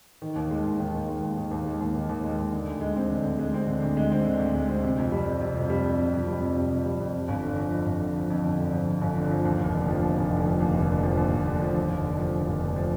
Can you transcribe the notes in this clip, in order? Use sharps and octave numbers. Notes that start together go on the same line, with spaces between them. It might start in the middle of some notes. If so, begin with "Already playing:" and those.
D#3
D#2
G#3
D#2
D#3
D#2
G#3
D#2
D#3
D#2
G#3
D#2
D#3
D#2
G#3
D#2
D3
D2
G#3
C4
D3
D2
G#3
C4
D3
D2
G#3
C4
D3
D2
G#3
C4
C3
F2
G3
F2
C3
F2
G3
F2
C3
F2
G3
F2
C3
F2
G3
F2
F2
G1
D3
F3
F2
G1
D3
F3
F2
G1
D3
F3
F2
G1
D3
F3
D#2
F1
D3
F3
D#2
F1
D3
F3
D#2
F1
D3
F3
D#2
F1
D3
F3
D#2
F1
D3
F3
D#2
F1
D3
F3